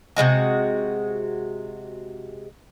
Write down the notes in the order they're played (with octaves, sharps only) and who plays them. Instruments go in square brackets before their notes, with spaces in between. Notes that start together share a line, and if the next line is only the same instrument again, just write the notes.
[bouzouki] C3 E3 G#3 F#4